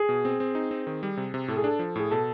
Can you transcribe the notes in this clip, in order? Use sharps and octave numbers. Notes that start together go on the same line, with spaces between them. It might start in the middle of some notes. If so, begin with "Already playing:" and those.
Already playing: G#4
B2
C4
C4
D#4
C4
D#3
G3
C3
C3
A2 A4
G#4
D4 A4
F3
A2 G#4
B2 A4